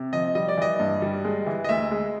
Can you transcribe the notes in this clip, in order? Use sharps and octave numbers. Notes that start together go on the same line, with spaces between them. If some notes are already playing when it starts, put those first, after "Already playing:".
Already playing: C3
F3 D#5
G3 D#5
D5
E3 D#5
G2
G3
G#3
E3
D#5
D2 E5
G#3